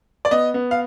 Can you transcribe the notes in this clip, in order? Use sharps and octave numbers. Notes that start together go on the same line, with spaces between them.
D5
B3 D#5
B3
F5